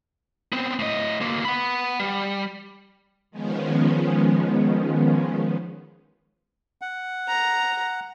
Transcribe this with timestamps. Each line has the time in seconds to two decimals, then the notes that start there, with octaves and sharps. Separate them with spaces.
0.52 B3 C4
0.79 A2 D#5
1.21 D2 A#3
1.45 F#5 B5
2.00 G3
3.31 D#3 F3 G#3 B3 C#4
6.82 F#5
7.28 A#5